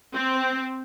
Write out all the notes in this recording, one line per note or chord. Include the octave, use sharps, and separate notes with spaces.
C4